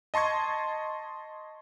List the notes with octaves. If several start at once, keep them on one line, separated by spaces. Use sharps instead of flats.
D#5 A5 C6 C#6 G#6